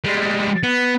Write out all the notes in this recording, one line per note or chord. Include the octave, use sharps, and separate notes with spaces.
G3 G#3
B3